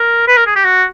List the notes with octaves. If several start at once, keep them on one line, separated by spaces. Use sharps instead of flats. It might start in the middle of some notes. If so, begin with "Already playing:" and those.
Already playing: A#4
B4
A#4
G#4
G4
F#4